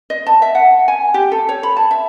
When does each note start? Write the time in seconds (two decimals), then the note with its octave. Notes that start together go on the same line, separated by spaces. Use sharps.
0.10 D#5
0.27 A5
0.42 E5
0.55 F#5
0.88 G#5
1.14 G4
1.32 A4
1.49 C#5
1.63 B5
1.77 A5
1.91 E5